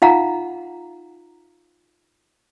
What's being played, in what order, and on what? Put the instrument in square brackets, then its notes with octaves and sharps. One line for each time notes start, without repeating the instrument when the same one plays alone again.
[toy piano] D#4 F4 F5 F#5 A#5